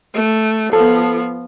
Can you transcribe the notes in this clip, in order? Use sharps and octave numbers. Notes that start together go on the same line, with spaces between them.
A3
F3 B3 A4